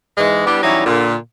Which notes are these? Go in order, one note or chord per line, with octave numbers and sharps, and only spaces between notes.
G#2 E3 G#3
G3 B3 D4 E4 G4
E3 F#3 G3 C#4 D#4 E4
A#2 D3